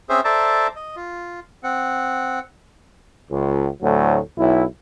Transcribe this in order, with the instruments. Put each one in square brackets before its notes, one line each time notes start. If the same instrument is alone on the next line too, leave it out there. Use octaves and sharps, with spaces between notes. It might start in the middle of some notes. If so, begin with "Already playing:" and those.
[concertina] C4 C#4 G#4 C5 E5
A4 C5 D5 E5 A5 A#5
D#5
F4
C4 F#5
[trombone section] C#2
D2 A2 F#3
B1 E4